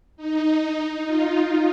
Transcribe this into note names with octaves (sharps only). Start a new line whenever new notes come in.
D#4
D#4
D#4
F4